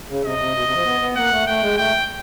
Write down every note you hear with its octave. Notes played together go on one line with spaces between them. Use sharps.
C#3
C3 D#5
C3
B2
C3
F3
B3
B3
A#3 F#5
A3
A3 G5
G#3
A3 G5